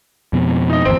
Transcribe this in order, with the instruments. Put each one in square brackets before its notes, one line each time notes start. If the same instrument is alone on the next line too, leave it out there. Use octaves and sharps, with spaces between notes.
[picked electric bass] F2 B2
[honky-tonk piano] D#4 D#5
[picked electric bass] G1 E2 [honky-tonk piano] C4